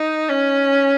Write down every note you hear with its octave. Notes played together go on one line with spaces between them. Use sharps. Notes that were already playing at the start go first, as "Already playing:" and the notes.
Already playing: D#4
C#4